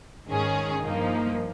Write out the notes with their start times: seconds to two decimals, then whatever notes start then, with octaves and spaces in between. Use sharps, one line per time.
0.27 G#2 D#3 G#3 C#4 G#4
0.84 G2 F3 A#3 D#4